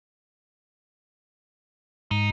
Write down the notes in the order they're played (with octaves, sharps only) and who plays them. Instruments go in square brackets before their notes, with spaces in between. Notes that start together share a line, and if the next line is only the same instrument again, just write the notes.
[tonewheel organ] G#2 [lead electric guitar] D#4